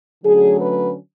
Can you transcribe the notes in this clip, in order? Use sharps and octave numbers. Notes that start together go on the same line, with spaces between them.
D3 F#3 A3 C#4 G#4
B4